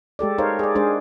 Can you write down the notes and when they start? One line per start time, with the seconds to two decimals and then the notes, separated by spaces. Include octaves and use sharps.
0.19 G#3 G4 A4 D5
0.38 D#4 A#4 C5 C#5 F5
0.59 G#4 D5
0.75 G#3 D4 G#4 C5